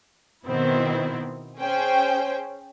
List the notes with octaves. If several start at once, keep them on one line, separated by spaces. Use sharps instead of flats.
B2 D#3 B3 C4 E4
C#4 G#4 C5 G5